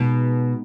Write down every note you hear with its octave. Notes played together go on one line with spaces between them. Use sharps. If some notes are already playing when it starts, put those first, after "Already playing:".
Already playing: B2 G#3 B3 D#4